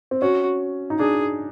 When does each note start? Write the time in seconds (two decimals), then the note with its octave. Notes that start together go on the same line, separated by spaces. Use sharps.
0.11 C4
0.22 C#4 F#4
0.90 D#4
0.99 D4 G#4